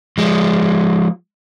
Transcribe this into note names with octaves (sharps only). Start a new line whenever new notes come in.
F3 G#3